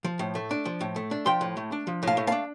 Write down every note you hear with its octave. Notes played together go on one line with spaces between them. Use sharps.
F3
A2
A3
D4
F3
A2
A3
D4
F3 G5 C6
A2
A3
D4
F3
A2 F5 A5
A3
D4 F5 A5